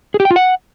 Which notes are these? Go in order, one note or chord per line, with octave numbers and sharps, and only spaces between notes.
G#4
G4
G5
F4
F#5